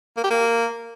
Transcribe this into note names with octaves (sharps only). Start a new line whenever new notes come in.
A#3
G4
A#3